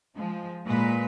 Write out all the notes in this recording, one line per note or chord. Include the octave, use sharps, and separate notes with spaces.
F3 G#3
A#2 G#3 B4